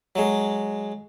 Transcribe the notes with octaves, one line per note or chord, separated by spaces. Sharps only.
F#3 G#3